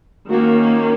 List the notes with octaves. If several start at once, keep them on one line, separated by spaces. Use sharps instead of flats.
D#3 A#3 C#4 F#4